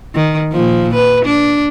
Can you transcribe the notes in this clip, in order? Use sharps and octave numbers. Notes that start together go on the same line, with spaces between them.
D#3
A#2 F3
B4
D4